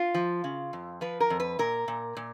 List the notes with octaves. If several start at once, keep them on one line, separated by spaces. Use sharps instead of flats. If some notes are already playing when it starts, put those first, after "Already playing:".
Already playing: F4
F3
C#3
F2
F3 B4
A#4
F2
B4
A#2 A#4
A#2
A#2